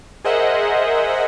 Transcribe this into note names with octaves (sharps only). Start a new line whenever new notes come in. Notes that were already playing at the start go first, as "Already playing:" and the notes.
G#4 A#4 C5 D#5 E5 F#5